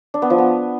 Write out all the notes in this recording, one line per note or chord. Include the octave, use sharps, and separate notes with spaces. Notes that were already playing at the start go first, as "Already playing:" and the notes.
D4
B3
F3
B3